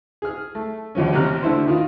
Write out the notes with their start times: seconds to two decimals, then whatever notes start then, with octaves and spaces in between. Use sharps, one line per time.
0.22 G#4 F6
0.55 A3
0.95 A#1 D#2 F3 C#4
1.13 A1 D#2 C3 A#5 F6 F#6
1.43 D3 A3 D4 E4 F#4 C5
1.65 A2 D#3 F4